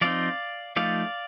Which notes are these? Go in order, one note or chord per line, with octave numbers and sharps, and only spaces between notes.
F3 C4 D#4 D5 F5
F3 A3 D#4 D5 F5